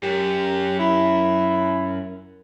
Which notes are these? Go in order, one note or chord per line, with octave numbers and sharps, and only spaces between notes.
F#2 G4
E4